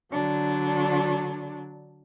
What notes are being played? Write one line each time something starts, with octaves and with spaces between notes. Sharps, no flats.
D3 F#3 D4